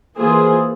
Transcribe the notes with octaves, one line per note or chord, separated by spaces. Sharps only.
E3 A#3 F4 G#4 C5